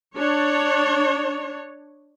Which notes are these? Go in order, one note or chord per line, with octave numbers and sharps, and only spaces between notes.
D4 C#5